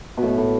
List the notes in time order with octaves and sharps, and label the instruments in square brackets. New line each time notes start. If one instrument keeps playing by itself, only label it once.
[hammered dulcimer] B2
A2
A2